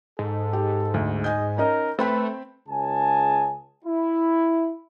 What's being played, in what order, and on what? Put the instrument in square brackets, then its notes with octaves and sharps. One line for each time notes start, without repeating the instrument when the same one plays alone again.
[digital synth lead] G#2 [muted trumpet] A4
[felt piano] G4
D2
[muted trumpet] D#5 [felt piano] G#5 G6
[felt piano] C#4 D#4 D#5 [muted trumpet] A#4
[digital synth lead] A3 [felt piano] C4 G5 B5 [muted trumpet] B4
[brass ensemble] C#2 C#3 G#4 G#5 A5
E4